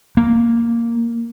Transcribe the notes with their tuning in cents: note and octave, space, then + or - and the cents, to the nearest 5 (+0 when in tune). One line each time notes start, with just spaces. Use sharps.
A#3 -5